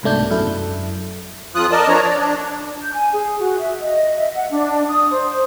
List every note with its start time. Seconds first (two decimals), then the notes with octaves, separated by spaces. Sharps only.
0.03 C2 G#2 B2 A3 D4 G6
0.31 F#2 E4 A4
1.55 F2 F3 F4 D#6 F#6
1.72 A#4 D5 D#5 A5
1.88 F3 D4 C#5 A#5
2.04 D5
2.20 D4
2.81 G6
2.93 G#5
3.13 G#4
3.39 F#4
3.59 E5
3.80 D#5
4.17 E5
4.35 F#5
4.50 D4
4.89 D#6
5.10 C5